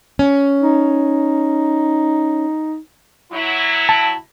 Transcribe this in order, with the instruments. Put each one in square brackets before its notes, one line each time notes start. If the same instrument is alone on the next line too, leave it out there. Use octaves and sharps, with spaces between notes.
[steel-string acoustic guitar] C#4
[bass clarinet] D#4
[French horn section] F#3 E4
[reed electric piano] A5